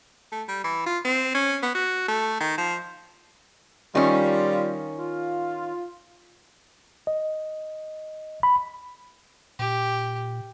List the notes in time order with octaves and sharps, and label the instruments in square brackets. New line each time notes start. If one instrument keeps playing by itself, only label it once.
[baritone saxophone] A3
G3
E3
F4
C4
C#4
B3
F#4
A3
D#3
F3
[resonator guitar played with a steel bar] D#3 C#4 [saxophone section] G3 F4
[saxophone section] F4
[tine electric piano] D#5
B5
[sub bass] A#2 [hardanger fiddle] G4